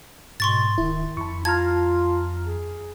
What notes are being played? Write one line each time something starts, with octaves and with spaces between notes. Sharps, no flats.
G#2 B2 C6 C#6 A6
D1 D#3 E4
F2 E4 A5 C#6
F4 A5 A#5 F6 G#6
G#4